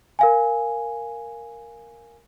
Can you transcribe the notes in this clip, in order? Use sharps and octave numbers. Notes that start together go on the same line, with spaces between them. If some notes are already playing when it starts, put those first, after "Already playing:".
A#4 F5 G#5